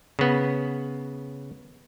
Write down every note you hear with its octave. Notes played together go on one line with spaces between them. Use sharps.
C#3 B3